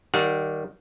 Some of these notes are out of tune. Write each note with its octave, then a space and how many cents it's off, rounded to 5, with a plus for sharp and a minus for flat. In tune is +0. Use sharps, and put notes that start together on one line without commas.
D#3 +0 G3 -20 F#5 -35